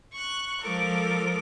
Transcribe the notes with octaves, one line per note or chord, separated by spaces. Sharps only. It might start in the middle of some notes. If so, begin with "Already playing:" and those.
C#6 F#6
F3 G#3 A4 A#4 D6